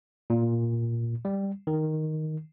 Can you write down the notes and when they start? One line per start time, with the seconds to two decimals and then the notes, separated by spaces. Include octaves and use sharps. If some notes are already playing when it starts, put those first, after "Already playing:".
0.30 A#2
1.25 G3
1.67 D#3